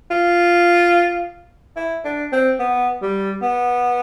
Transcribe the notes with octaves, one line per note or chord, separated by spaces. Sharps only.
F4
E4
D4
C4
B3
G3
B3